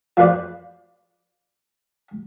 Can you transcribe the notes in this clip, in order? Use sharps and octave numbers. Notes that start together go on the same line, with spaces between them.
F3 F4 B4 D5